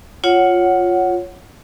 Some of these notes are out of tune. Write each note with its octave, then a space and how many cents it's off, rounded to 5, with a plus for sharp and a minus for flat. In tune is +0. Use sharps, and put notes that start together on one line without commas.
F4 +5 C#5 +0 F#5 +0